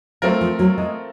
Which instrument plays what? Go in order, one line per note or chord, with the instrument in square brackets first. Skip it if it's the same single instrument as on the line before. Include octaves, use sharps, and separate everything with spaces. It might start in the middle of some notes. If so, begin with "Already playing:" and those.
[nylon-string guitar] F#3 [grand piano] A3 C4 F4 A#4
[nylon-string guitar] F3
F#3
G#3